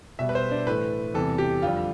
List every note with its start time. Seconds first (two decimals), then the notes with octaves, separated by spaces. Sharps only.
0.19 B2 G3 E5
0.29 B4
0.35 C5
0.51 D4
0.67 A2 E3 A3 B4
1.14 E2 C3 E3 G3 A4
1.38 G4
1.62 F2 D3 G3 F4